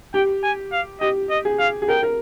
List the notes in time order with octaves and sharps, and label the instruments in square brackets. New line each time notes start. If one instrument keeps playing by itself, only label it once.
[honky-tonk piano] G4 [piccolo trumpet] G5
[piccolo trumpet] G#5
F5
[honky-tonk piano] G4 [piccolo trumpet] D#5
[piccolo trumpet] D#5
[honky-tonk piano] G#4
[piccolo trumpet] F5
[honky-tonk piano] G#4
[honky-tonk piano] A#4 [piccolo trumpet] G5
[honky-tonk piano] A#4